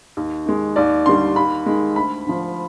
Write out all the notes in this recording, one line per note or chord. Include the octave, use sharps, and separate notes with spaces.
D#2
D#3 G#3
D#2 D5
D3 G3 C6
D#2 B5
D#3 G#3
D2 B5
D3 F3